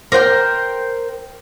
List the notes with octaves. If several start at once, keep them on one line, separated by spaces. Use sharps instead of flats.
A#4 C5 F#5 G5